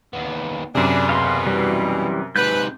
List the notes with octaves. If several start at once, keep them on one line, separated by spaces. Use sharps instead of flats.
D#2 B3
F#2 C3 D4 G#4 B4
B2 F5 C6
E3 G3
G#2 C3 B4 G6